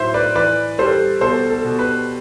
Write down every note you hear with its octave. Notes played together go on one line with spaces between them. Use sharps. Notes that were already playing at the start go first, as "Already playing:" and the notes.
Already playing: A2 F#3 C5 E5
B4 D5
E3 B4 D5
G3 A4 C5
B2 A4 C5
A4
B2
B4